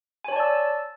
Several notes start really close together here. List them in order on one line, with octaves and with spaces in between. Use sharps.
G#5 C#5 A5 D5 E6